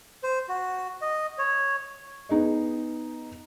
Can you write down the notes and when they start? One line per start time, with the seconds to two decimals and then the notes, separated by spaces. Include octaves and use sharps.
0.23 C5
0.49 F#4
1.01 D#5
1.38 C#5
2.29 B3 D#4 G#4 D#5